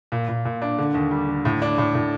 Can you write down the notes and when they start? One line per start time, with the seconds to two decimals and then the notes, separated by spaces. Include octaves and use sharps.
0.12 A#2
0.28 A#2
0.45 A#2
0.62 D4
0.78 D3
0.94 D#2
1.11 G3
1.28 D3
1.45 A2
1.62 D4
1.78 A2
1.95 A2